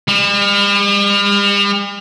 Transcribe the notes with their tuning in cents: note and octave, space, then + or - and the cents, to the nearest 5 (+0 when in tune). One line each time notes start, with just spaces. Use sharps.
G3 +45